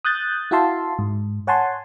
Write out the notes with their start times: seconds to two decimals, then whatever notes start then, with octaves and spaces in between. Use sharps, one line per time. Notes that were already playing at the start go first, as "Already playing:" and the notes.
0.05 D#6 F#6 G6 A6
0.51 E4 F#4 E5 F5 A5 C6
0.99 G#2
1.47 C#5 F#5 G#5 A5 C6